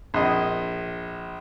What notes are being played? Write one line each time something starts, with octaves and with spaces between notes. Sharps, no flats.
A#1 D#5